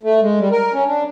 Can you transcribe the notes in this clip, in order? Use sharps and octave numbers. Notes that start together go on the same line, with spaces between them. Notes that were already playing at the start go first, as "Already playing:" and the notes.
A3
G#3
G3
A#4
C#4
D4